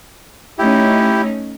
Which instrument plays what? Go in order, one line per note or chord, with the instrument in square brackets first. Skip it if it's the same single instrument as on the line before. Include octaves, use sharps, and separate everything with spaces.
[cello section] A3 C#4 D#4 [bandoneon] E4 G4